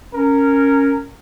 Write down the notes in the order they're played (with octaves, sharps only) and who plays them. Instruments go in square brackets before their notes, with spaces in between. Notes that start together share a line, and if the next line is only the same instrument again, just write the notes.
[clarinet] C#4 [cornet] A#4